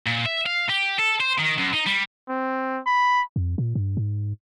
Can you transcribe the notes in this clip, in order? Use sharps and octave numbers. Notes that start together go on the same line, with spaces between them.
A#2
E5
F5
G4
A4
C5
D#3
F#2
D#4
G3
C4
B5
F2
A#2
G2
G#2